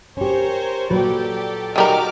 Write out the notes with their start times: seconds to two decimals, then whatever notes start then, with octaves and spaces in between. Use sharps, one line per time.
0.17 C#4 G4 A#4 C5 C#5
0.90 A#2 F#3 G4 A4 B4 D5
1.76 D#3 G3 F#4 A#4 D6 F6